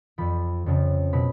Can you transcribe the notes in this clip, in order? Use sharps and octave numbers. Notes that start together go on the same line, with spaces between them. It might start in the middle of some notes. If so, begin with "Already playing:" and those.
F2 F3 B5
F2 C#3 F3
B2 F#3 B5